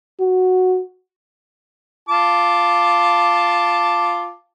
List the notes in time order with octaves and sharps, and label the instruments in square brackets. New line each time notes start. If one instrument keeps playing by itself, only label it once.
[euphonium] F#4
[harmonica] F4 A5 D6